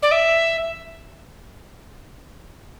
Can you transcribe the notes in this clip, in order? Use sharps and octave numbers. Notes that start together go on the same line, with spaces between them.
D5
E5